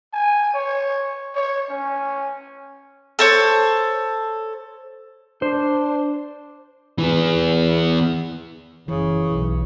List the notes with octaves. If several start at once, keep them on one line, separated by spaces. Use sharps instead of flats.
G#5
C#5
C#5
C#4
A4 C5 C#5
D4 C5
E3 B3
F#1 C#3 E3 C#4
B1